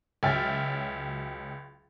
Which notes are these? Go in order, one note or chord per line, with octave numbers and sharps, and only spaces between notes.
C#2 F#3 E5 G5 F6 A6